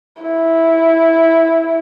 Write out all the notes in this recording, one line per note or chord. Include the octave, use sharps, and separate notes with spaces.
E4